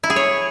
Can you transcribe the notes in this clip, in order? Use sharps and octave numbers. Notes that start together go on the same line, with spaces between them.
E4
G#4
C#5